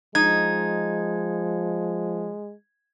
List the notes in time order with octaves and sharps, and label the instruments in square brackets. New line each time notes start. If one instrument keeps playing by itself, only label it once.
[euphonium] F3 [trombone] G#3 [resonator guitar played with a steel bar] D#4 [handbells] G#6